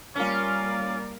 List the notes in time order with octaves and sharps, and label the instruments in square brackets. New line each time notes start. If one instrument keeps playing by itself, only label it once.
[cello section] G3 A#3 A#4 [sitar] C#4 F4 [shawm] D5